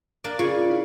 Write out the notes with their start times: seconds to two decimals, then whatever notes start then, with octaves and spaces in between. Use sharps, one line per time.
0.24 A#3 D4 D5
0.39 C#3 F4 G#4 C#5 D5
0.70 E4 F5